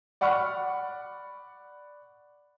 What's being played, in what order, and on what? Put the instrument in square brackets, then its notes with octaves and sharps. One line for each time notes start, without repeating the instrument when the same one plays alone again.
[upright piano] D5 F#5 B5 C#6 F6 F#6